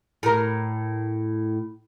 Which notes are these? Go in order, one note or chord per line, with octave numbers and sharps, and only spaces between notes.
A2 A#4